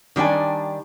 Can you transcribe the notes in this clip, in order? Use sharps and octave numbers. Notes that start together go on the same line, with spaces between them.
D#3 G3 D4 G5 G#5